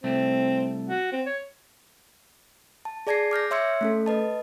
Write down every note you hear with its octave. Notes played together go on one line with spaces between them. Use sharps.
C2 A3 C4
F#4
C4
C#5
A5
G#4 D5 A5 G#6 A#6 C7
D6 F6 G6 A#6
C#5 E5 C6 E6 G#6 C#7
A3 C#4 A4
B4 D#5 A5